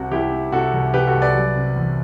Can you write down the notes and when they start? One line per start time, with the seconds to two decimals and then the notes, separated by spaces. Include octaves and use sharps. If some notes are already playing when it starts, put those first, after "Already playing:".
Already playing: C2 C3 F#4
0.11 C2 E4 G4
0.32 C3
0.52 C3 F#4 A4
0.73 C2
0.94 C2 G4 B4
1.07 F#4 A4
1.14 C2
1.22 B4 D5
1.35 F#3
1.56 C3
1.76 E2